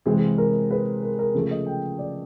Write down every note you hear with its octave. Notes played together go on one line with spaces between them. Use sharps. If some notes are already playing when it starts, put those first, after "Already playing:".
C3 E3 G#3 C4 G#4
A#4
B4
A#4
A#4
C#3 F3 A3 A4
D#5
G5
D5